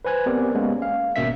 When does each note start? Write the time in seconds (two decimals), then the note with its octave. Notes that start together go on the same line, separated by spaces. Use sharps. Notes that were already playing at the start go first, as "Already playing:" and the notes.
0.05 B4 C5 G#5 F#6 G#6
0.26 B3 C4 G4 A#4 D5
0.55 G#3 A#3 B3 C#4
0.82 F5
1.16 G#1 B2 A#3 C#4 E5 B6